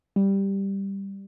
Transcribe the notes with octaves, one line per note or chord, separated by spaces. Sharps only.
G3